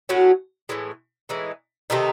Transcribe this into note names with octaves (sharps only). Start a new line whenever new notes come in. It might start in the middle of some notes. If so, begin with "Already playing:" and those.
A2 F#3 C#4 F#4
A2 E3 G#3
A2 E3 G#3 D#4
C3 D#3 A3 D#4